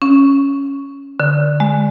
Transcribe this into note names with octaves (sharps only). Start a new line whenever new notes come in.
C#4
D3
G#3